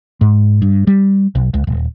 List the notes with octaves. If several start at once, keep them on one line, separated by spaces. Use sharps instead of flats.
G#2
G2
G3
B1
C#2
D#1